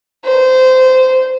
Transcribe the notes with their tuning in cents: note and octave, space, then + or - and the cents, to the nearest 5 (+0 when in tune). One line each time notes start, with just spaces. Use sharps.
C5 -20